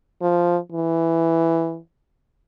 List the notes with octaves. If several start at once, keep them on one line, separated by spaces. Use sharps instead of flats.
F3
E3